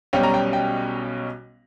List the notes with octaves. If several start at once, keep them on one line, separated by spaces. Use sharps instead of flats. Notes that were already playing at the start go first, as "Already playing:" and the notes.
B1 B2 G3 C#4 G5
A#5
G5
G5